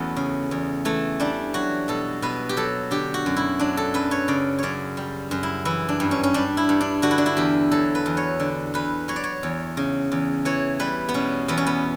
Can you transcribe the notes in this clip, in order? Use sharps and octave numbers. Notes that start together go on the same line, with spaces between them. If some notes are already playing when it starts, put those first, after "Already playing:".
Already playing: E2 F#3 A3 B3 C#4
C#3
E2
E3 A3
G3 D4
F#3 F#4
B2 A4
B2 B4
G4
F#3 A4
D3 G4
F#4
F#2
E4
F#3 D4
A4
F#2 B4
C#5
C#3 D5
F#2 C#5 D5
G3
F#2
E4
E3 E4
D4
G2
C#4
C#4
G3 D4
E4
G2
D4
D3 F#4
E4
D4
E4
E2 G4
F#3 A4
B4
E2
C#5
D3
E2 B4
F#3 C#5
D5
C#5
E2
C#3
E2
E3 C#5
G3 B4
B3
B2 C#4
E2 B3
C#4
B3